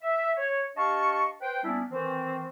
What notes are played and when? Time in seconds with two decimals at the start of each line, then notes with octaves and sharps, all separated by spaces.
0.01 E5
0.37 C#5
0.76 D4 G4 D#5 F5 A5 C#6
1.41 B4 C5 G5
1.64 G3 A#3 B3 C#4 D4 E4
1.90 D#3 E3 C4